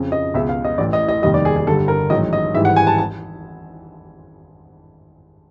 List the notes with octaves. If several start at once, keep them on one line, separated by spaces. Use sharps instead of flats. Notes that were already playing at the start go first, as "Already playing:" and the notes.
Already playing: F2 C#3 F3
D#5
C#2 B2 G#3 E5
F5
D#5
A1 A2 E3 D5
D#5
D#5
F1 D#2 D#3 G3 D#5
D5
G#4
G#4
G1 G2 D3 G3 A4
A#4
A1 G#2 D#3 F#3 D#5
D#5
G#1 G#2 E3 G3 E5
F#5
G#5
A5
A5